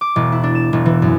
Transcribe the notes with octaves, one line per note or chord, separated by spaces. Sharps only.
D6
E1
E4
D4
E7
E1
E3
F#2